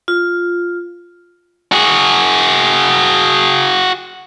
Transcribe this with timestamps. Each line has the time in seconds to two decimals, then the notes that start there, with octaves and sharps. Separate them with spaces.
0.08 F4
1.72 F#4 G#4